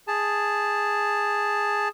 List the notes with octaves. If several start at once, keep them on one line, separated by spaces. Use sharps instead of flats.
G#4 A5